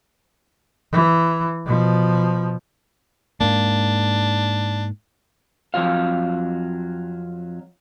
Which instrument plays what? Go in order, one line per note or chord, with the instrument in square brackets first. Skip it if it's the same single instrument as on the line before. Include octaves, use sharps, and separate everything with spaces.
[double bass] E3
B2 F3
[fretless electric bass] G#2 A#3 [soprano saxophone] D4
[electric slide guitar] F2 D#3 F#3 F4 F5